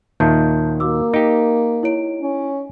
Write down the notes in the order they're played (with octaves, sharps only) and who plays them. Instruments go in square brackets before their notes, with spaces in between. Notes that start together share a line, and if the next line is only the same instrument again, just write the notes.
[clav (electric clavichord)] D#2 A#2 D#3 [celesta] E5 A5 G6
[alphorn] A#3 [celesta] F#4 D6 E6
[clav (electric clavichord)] D#4 G4 [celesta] D7
[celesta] E4 C#5 D7
[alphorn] C#4